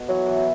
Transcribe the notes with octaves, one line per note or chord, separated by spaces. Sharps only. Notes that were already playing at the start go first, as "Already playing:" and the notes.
Already playing: B2
E3 F#3
E3